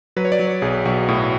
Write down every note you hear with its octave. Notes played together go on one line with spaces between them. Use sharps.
F#3 B4
C#5
D5
F#3
C#5
B1 G#4
B1 F#4
A2